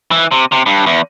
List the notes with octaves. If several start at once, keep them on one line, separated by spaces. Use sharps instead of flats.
E3
C3
C3
G2
E2